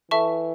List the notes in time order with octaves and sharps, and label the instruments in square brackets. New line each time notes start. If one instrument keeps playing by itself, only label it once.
[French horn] E3 [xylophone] A4 E5 A5 C#6